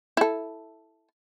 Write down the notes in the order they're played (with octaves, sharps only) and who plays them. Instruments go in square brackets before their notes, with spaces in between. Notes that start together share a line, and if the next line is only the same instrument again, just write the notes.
[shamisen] E4 A4